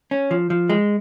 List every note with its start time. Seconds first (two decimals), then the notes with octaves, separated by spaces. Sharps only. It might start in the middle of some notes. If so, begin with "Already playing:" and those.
0.11 C#4
0.31 F3
0.50 F3
0.70 G#3